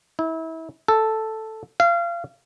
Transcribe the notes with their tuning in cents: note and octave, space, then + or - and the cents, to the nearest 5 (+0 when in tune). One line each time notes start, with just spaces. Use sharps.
E4 -30
A4 +0
F5 -30